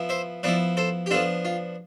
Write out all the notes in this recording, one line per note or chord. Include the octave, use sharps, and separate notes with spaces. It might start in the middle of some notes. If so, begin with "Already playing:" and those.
Already playing: F3 B3 E4
C5 E5
F3 B3 E4 B4 D5
A4 C5
G4
F3 B3 D4 F4 A4
F4